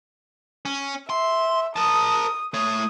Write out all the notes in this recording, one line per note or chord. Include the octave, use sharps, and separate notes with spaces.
C#4
E5 C6
A#4 A5 D#6
A3 C#5 D#6